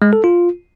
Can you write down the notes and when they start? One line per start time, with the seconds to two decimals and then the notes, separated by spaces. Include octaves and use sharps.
0.02 G#3
0.13 A4
0.24 F4